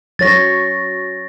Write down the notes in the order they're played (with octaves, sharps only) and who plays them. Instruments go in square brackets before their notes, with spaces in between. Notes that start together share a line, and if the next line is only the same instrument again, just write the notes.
[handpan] F#3 C#5 [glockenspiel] A6 A#6